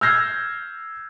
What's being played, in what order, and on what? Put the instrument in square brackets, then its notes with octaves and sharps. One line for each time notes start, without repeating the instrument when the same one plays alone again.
[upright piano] E6 F6 G6 G#6 A#6 C7